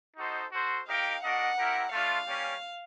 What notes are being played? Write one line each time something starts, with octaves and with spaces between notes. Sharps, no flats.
D#4 F#4 A4 C5 D#5
F#4 A4 C5
D#4 G4 A#4 D#5 F5 G5
D4 F#4 A#4 D#5 F#5
C4 E4 G4 A#4
A3 D4 F4 F5
G3 A#3 C#4